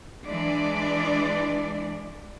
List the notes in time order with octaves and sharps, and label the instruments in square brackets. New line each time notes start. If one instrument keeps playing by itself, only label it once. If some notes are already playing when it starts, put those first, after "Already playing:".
[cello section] E3 G#3 D4 D5